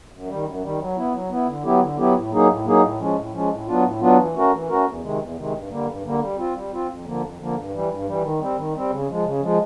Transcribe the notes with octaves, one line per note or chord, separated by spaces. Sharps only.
F#2
D#3 G3
F#2
D#3 G3
F#3
B3 E4
F#3
B3 E4
D3
F#3 B3 E4 G4
D3
F#3 B3 E4 G4
A2
F#3 A#3 D#4 G#4
A2
F#3 A#3 D#4 G#4
A2
F3 G#3 C#4
A2
F3 G#3 C#4
A2
F#3 B3 D4 F4
A2
F#3 B3 D4 F4
E3
A3 C#4 F#4 A#4
E3
A3 C#4 F#4 A#4
E2
C3 D#3 G#3
E2
C3 D#3 G#3
G2
D3 G3 A#3
G2
D3 G3 A#3
G3
C4 F4
G3
C4 F4
F2
D3 F3 A#3
F2
D3 F3 A#3
G2
E3 G3
G2
E3 G3
D#3
G3 C4
D#3
G3 C4
C#3
F3 G#3
C#3
F3 G#3